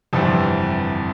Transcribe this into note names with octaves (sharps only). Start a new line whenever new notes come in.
G1 F2 C3 E3 G3